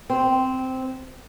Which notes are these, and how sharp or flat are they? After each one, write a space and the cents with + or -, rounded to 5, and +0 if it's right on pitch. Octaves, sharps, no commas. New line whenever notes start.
C4 -10